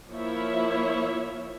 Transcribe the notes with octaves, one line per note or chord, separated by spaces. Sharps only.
F3 A#3 E4 C#5 E5